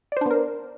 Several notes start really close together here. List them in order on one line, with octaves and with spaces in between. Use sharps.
D5 C5 D4 B3 A#4